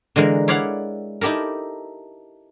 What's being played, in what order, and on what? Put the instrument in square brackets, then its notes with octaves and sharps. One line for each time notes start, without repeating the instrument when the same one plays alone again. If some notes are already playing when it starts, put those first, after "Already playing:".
[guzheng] D3 E3 G#3 A#4
E4 C#5 D5 F5 F#5
D#4 E4 G4 A4 A#4